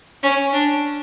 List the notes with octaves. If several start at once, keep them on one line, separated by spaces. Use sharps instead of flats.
C#4
D4